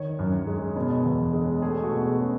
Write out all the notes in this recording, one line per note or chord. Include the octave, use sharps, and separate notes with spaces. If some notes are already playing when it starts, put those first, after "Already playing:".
Already playing: D#3 C#5
F#2
G#3
B2
E2
G#3
A3 G#4
F#4
B2
G#4
C#4